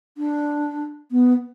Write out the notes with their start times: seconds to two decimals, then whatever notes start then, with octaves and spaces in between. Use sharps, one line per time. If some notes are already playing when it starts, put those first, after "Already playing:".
0.18 D4
1.11 B3